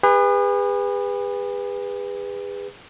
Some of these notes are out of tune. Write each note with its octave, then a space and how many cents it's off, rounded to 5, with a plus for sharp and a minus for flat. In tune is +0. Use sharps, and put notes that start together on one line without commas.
G#4 -40 B4 +0